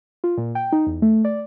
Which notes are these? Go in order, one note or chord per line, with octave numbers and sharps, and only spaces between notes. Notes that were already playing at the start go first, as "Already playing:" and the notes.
F4
A#2
G5
D#4
E2
A3
D5